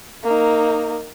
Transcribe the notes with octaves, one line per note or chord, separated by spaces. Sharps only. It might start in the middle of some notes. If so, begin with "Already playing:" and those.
A#3 D#4